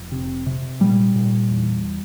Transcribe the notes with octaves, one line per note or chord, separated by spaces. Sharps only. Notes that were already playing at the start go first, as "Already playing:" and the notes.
Already playing: F1
C3
C3
A#2 G3
A#2
E2